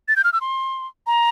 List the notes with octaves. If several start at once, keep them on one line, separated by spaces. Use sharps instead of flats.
A6
G6
F6
E6
C6
A#5